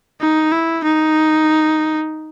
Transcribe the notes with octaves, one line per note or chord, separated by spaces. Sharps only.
D#4
E4
D#4